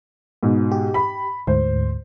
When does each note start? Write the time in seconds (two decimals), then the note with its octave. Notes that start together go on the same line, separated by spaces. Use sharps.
0.43 G#2 B2
0.72 G4
0.94 B5
1.47 D2 G#2 C5